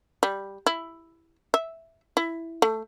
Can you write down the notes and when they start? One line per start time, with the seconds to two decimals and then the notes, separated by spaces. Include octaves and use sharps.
0.23 G3
0.67 E4
1.54 E5
2.17 E4
2.62 A3